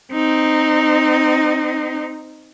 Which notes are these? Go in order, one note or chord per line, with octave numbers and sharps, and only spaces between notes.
C4 D#4